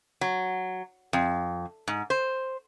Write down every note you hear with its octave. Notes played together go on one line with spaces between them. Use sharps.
F#3
F2
G#2
C5